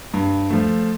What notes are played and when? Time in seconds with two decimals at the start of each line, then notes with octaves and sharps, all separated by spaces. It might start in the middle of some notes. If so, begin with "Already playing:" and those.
0.14 G2
0.51 F3 A3